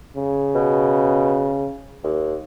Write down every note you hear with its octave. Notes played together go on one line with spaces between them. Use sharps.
C#3
B2
D#2